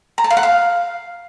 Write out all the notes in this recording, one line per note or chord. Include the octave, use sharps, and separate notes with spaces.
A#5
A5
F5
F#5
F5